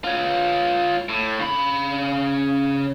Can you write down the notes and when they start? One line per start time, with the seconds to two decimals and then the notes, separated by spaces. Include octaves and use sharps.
0.04 F4 C#5
1.09 A2
1.40 C#3 B5